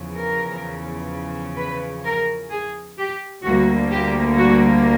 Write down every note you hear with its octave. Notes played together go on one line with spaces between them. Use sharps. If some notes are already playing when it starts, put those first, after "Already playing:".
Already playing: E2 C#3 F3
A#4
B4
A#4
G#4
G4
D2 D3 G3 A#3 F#4
G4
F#4